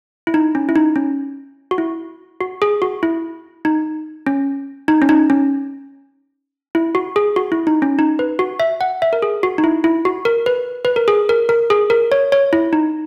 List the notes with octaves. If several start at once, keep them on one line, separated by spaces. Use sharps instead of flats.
E4
D#4
C#4
E4
D#4
C#4
F#4
E4
F#4
G#4
F#4
E4
D#4
C#4
D#4
C#4
D#4
C#4
E4
F#4
G#4
F#4
E4
D#4
C#4
D#4
B4
F#4
E5
F#5
E5
A#4
G#4
F#4
D#4
E4
E4
F#4
A#4
B4
B4
A#4
G#4
A#4
A#4
G#4
A#4
C#5
C#5
E4
D#4